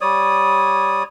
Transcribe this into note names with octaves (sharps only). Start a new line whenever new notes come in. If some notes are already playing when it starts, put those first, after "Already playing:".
G3 C#5 D5 D#6